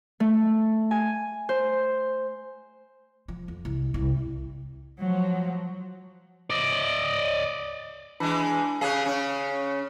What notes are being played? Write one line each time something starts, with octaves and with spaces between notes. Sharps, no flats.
A3
G#5
C5
F3
F2
C2
C2
F3 F#3
D5 D#5
E3 G#3 D4 B5
C#3 C#4 G#4 F5 F#6
C#3 C#4